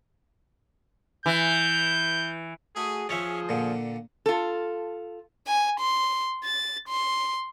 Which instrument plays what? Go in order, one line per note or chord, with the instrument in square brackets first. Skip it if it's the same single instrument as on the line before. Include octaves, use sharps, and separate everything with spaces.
[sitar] E3 [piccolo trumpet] G6
[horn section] A3 F#4 G#4
[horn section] F3 G#4 [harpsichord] C#4 C#5 E5
[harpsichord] A#2 D3
[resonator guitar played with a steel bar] F4 A4
[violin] G#5
C6
A6
C6